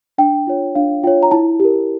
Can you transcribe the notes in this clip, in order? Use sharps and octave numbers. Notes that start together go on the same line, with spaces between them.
D4 G5
F4 C#5
D4 F5
F4 C#5 G5
A#5
E4 A5
G4 A#4